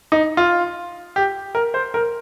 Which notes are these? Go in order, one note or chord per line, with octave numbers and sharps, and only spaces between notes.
D#4
F4
G4
A#4
C5
A#4